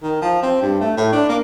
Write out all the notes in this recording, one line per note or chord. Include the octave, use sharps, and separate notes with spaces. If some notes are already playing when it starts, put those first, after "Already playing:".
D#3
F3
C4
G2
A3
A2
D4
A#3